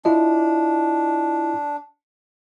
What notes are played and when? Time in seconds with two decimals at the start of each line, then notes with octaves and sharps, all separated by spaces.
0.05 D4 E4 F4 D#5